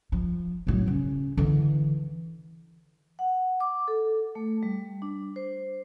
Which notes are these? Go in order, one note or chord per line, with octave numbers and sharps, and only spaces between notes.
F3
A2 F#3
C#3 C#4
D3 E3
F#5
D6
A4
A3
G3
D4
C5